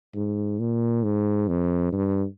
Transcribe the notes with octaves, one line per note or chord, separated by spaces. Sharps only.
G#2
A#2
G#2
F2
G2